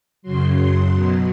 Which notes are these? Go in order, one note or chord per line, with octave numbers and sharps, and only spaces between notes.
F#2 C#3 F#3 C6
B2 F#3